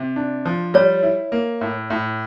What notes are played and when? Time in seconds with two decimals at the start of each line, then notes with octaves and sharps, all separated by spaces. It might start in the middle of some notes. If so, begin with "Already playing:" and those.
Already playing: C3
0.16 D4
0.46 F3
0.74 G3 C#5
1.03 E4
1.32 A#3
1.61 A2
1.90 A2